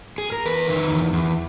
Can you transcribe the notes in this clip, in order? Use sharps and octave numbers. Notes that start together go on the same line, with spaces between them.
G#4
A#4
E2 B4
D#3
E2
E2